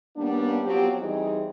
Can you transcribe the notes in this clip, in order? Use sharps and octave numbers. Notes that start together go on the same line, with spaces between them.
G3 A#3 B3 C#4 D4
F3 F#3 B3 C4 G4
E2 E3 G3 C4 D#4 G#4